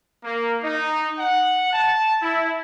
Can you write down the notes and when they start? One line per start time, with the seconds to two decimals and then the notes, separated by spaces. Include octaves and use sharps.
0.24 A#3
0.63 D#4
1.18 F#5
1.73 A5
2.22 E4